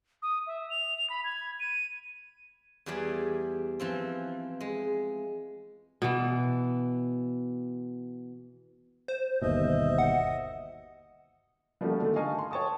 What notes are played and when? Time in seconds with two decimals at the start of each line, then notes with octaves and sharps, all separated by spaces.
0.22 D#6
0.47 E5
0.70 F7
0.98 F7
1.10 B5
1.24 G#6
1.60 D#7
2.86 E2 E3 G3 G#4 D5 B5
3.80 E3 F3 C4
4.60 G#3
6.02 B2 E3
9.08 C5
9.42 G1 D#2 B2 D#5 E5
9.98 F#5
11.81 F3 G3 A3 A#3 C#4 F#4
12.00 D3 D#3 G#3 A3
12.16 D#5 F5 G#5 A5 C#6
12.39 C6
12.51 C#5 G5 A5 C#6 D#6